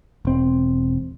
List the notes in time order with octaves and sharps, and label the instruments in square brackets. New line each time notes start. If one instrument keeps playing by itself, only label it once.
[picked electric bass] E1 C4